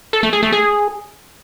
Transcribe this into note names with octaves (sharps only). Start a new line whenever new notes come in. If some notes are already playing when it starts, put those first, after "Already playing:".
A4
A3
G#4
A3
G#4